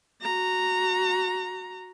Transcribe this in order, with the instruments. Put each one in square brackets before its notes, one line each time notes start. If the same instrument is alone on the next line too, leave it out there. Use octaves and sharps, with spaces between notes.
[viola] F#4 A#5